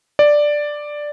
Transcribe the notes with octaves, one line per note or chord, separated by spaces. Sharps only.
D5